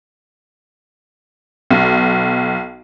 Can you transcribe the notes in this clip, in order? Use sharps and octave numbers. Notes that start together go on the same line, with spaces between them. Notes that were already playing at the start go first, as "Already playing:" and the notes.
B1